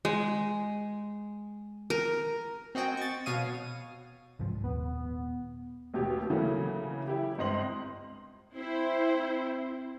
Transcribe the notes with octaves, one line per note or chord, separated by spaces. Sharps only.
G#3
A#4
C4 F#4 D#5 G5 G#5
C#6 A6
B2 C#5 F5 D#6 D#7
C2 G#2 F3
D#1 B3
A1 D#2 B2 G4
C#3 E3 F#3 A3 A#3
E4 G4
G1 C#2 C4 D#5 C6 F#7
C4 E4 C5